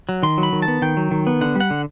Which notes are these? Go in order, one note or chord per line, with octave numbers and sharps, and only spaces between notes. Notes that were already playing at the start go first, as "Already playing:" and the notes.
F#3
D#3 C6
F#3
B5
D#3
A5
B3
D#3 G5
F#3
D#3
B3
D3 F#5
G3
F#5
D3